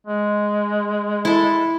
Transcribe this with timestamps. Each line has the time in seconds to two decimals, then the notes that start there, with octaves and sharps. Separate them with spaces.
0.07 G#3
1.25 E4 A4